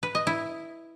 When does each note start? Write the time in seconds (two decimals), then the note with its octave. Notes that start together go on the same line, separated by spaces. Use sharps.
0.03 B4
0.15 D#5
0.27 E4